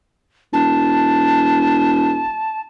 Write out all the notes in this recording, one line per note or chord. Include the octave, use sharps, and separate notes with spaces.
E1 A5